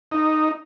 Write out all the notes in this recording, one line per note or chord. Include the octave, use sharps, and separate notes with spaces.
D#4